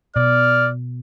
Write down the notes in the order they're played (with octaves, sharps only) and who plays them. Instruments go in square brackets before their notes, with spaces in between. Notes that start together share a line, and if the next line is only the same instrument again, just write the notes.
[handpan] B2 [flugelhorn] D5 [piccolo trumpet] F6